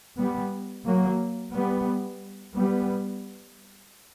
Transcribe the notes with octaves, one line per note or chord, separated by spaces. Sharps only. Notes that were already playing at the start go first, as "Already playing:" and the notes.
G3 B3
F#3 A#3
G3 B3
G3 B3